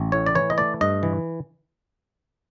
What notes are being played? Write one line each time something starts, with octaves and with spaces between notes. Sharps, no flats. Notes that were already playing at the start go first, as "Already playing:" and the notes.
Already playing: A1
A2 C#5
D5
E3 C#5
D#5
A3 D5
G2 D#5
E3